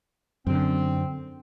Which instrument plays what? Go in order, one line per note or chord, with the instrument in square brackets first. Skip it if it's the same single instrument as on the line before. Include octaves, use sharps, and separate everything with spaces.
[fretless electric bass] F#2 D3 [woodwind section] C4